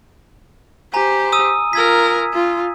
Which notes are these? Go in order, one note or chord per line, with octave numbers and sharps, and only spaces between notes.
G4 C5 G#5 A#5
D#6 E6 D#7
F4 A#4 E6 G#6 B6
F4